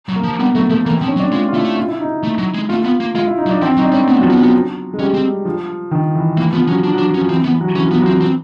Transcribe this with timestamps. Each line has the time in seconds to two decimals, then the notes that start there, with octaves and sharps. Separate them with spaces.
0.09 F#3
0.16 A#3
0.24 F3
0.39 G3 B3
0.55 F#3 A3
0.70 F3 A3
0.85 E3 A#3
0.97 C4
1.01 F3
1.08 C#4
1.16 F#3
1.20 D4
1.32 G#3 F4
1.48 F4
1.54 A3 E4
1.77 F4
1.88 E4
2.01 D#4
2.24 A3
2.38 F#3
2.55 G#3
2.69 A3 F4
2.82 F4
2.85 B3
3.00 A#3
3.15 G#3 F4
3.27 E4
3.38 D#4
3.46 F#3
3.50 D4
3.62 F3 C4
3.77 F#3 D#4
3.85 D4
3.92 G3 C#4
3.99 C4
4.07 A3 B3
4.18 F#3
4.23 F3
4.30 B3
4.39 F#3
4.94 G#3
4.99 G3 C#4
5.14 C4
5.45 F3
5.91 D#3
6.15 E3
6.37 E3 A#3
6.53 F3 B3
6.68 F#3 C#4
6.84 D4
6.94 F#3
6.98 D4
7.07 F3
7.14 C#4
7.18 F3
7.29 E3 C4
7.44 E3 B3
7.61 F#3
7.75 E3 C#4
7.87 F3
7.91 B3
7.99 F#3
8.06 C4
8.10 E3
8.21 C4